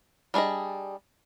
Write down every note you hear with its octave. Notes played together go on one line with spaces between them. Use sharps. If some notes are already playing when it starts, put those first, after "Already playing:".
G3 D4 G#4 D#5